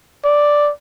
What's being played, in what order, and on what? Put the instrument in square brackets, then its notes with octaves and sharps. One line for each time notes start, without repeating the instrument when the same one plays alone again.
[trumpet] D5